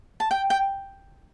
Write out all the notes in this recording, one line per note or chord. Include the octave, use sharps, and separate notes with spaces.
A5
G5
G5